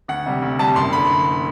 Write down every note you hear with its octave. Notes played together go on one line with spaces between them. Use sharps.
D2 F#5
C3 G3
D2
C3 G3 A5
F#1 C6
D3 B5